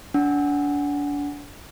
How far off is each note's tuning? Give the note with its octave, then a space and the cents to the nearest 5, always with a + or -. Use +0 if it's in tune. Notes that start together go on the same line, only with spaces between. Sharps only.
D4 -35 F#5 +5